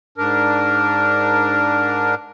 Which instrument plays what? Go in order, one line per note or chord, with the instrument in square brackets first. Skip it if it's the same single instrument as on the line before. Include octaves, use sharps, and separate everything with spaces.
[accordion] G#2 D4 A#4